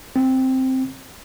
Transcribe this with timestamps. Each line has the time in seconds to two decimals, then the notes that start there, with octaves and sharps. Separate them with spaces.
0.16 C4